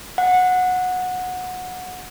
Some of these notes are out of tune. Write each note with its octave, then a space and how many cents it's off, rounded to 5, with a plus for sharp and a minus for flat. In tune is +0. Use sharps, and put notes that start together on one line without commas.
F#5 -15